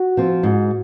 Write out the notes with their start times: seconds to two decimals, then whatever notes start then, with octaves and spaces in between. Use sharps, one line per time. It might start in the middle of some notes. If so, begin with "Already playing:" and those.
Already playing: F#4
0.17 F3 C4
0.43 G#2